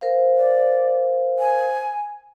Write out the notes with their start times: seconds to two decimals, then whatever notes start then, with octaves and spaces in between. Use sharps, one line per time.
0.01 A#4 C5 F5
0.37 D5
1.39 G#5